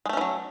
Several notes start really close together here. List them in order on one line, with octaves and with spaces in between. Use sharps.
G#3 A3 C#4 E3 F#3